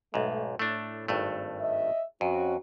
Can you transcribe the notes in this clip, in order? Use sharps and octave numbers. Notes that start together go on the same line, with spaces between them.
B1 G#2 A3
A2 A3 D4
G#1 G2 A3
D#5 E5
F2 C#4 F#4